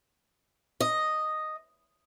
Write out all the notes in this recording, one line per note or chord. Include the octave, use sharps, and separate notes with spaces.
D#5